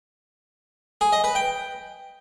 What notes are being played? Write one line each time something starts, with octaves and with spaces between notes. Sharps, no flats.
G#4
D#5
B4
G5